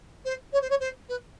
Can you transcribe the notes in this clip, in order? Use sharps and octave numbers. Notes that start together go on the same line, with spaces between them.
C5
C#5
C5
C#5
C5
B4